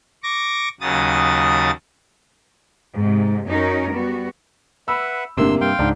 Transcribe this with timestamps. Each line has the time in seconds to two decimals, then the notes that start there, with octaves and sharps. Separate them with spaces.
0.23 C#6 D6 A#6
0.81 D#2 C#3 F#3 D#6 A6
2.94 G#2 C3
3.46 F#2 C#4 D#4 F#4 A#4
3.90 G3 B3 F#4
4.88 B4 E5 F#5 B5 E6
5.37 G1 A2 C3 A#3 D4 C6 E6
5.61 G2 F5 G5 C6
5.79 C#2 G#2 D4